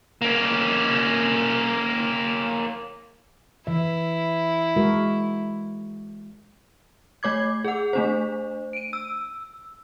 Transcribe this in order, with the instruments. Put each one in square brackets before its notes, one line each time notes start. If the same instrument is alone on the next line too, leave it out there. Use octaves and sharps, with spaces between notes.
[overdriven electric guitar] A#3 C#4
[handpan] E3 E5 [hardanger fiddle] E4
[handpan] G#3 F#4 A#4
[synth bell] A3 C#5 D6 G#6
G#4 F#5
A3 D4 C5
D7 D#7
E6